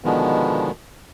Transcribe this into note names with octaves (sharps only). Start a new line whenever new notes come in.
B2 D3 D#3 F3 G#3 B3